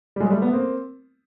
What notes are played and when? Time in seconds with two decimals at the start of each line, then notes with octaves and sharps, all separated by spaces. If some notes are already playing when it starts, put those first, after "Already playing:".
0.16 G3
0.20 F#3 G#3
0.30 G3 A3
0.42 A3 B3
0.53 A#3 C4